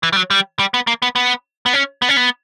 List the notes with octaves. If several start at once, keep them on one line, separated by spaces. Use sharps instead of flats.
E3
G3
F#3
G3
G3
B3
A#3
B3
B3
B3
C#4
B3
C#4
B3